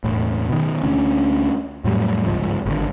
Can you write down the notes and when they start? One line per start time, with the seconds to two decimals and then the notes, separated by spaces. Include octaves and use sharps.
0.04 E1 A2
0.49 B2 D#3
0.84 D2 D3 C#4
1.84 F2 A2 F#3 G3
2.26 G1 C#2 G#2 F3
2.66 G#1 B2 D3